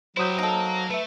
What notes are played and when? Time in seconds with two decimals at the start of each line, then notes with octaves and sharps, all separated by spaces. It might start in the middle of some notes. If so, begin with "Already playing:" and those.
0.17 F#3 E4 G4 C5 D#6 G6
0.39 D#4 A4 A#4 F5
0.91 A3 B4 E5